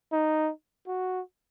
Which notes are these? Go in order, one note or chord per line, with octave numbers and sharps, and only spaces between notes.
D#4
F#4